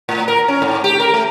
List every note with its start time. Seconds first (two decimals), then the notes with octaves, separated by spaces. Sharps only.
0.09 A2
0.28 A#4
0.48 C#4
0.62 G#2
0.84 G4
1.00 A#4
1.14 A3